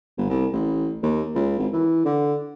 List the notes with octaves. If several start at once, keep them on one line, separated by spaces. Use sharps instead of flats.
G1
C2
A1
D#2
C#2
G#1
E3
D3